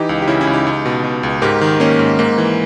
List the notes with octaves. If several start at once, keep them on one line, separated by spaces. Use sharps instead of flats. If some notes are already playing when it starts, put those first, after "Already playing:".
Already playing: E3 D#4 G4
C#2
G4
C#3 C#4 E4
C#4 E4
C#2
D#4 G4
C#2
B2
B2
C#2
G#2 G4 A#4
D#3
D#3 A#3 C#4
G#2
G#2 A#3
E3